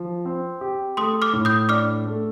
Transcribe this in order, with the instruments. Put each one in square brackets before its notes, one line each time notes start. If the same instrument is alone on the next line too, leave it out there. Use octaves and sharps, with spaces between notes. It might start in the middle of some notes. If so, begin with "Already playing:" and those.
Already playing: [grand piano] F3
C4
G4
[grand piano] A3 [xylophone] C6 D#6
[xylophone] D6 F6
[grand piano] A2
[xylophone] D#6 G6
[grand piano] D4 [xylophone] D6 F6
[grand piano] A3